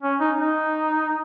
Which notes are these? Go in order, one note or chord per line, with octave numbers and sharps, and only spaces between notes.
C#4
D#4
D#4